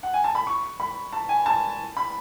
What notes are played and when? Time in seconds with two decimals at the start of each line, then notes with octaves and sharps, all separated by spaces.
0.03 F#5
0.14 G#5
0.24 A5
0.35 B5
0.47 C#6
0.80 B5
1.13 A5
1.29 G#5
1.46 A5
1.97 B5